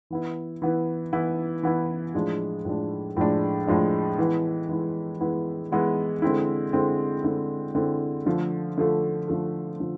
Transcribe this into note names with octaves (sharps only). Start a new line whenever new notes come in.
E3 B3 E4
E3 B3 E4
E3 B3 E4
E3 B3 E4
A2 F3 G#3 D4
A2 F3 G#3 D4
A2 F3 G#3 D4
A2 F3 G#3 D4
E3 G#3 B3 E4
E3 G#3 B3 E4
E3 G#3 B3 E4
E3 G#3 B3 E4
D3 G#3 C4 E4
D3 G#3 C4 E4
D3 G#3 C4 E4
D3 G#3 C4 E4
D3 F3 A3
D3 F3 A3
D3 F3 A3
D3 F3